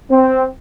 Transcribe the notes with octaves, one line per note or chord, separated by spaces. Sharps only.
C4